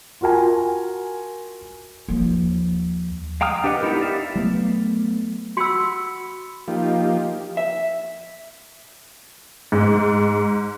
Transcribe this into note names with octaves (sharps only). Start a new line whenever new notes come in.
F4 F#4 A#4 G#5
D#2 F3
F5 G5 A#5 D#6 F6
D4 G4 B4 D#5 F#5
B3 D#4 E4 G4 A#4
D5 E5 F5
F#3 A3 B3
F#4 B5 C6 E6 C#7
F3 A#3 D#4 F4 G4
E5
G#2